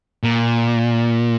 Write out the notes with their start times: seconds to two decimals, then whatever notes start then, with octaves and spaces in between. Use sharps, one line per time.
0.23 A#2